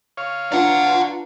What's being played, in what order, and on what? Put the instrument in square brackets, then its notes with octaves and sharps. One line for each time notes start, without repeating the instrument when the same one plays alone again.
[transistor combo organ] C#5 F5
[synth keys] D4 B4 A#5 [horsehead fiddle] F4 [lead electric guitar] D5 F#5